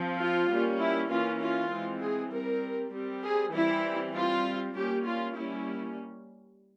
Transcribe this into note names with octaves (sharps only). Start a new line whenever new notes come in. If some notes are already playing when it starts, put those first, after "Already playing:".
Already playing: F3 C4
F4
G3 A#3 C#4
E4
E3 A#3 C#4 F4
F4
E3 G#3 C4
G#4
G3 C4 A#4
G3 C4
G#4
E3 G3 C4 E4
G3 C4 F4
G3 A#3 C#4 G4
F4
G3 A#3 C#4 E4